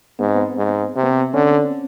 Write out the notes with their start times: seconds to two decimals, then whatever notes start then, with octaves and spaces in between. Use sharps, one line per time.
0.19 G#2 B3
0.27 C4
0.36 B3
0.58 G#2
0.96 C3 C4
1.03 B3
1.11 C4
1.34 D3 C#4